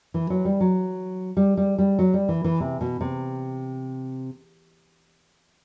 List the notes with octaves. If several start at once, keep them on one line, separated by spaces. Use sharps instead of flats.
E3
F#3
G3
F#3
G3
G3
G3
F#3
G3
E3
E3
C3
B2
C3